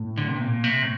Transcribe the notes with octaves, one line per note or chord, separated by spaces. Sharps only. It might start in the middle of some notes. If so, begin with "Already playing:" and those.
Already playing: A2
D3
C3
A#2
C3
A2